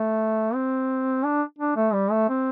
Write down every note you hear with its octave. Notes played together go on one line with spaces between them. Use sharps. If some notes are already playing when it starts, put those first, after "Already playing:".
Already playing: A3
C4
D4
D4
A3
G3
A3
C4